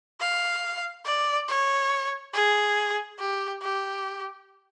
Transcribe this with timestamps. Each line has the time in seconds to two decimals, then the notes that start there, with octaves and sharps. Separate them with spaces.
0.20 F5
1.05 D5
1.48 C#5
2.33 G#4
3.19 G4
3.62 G4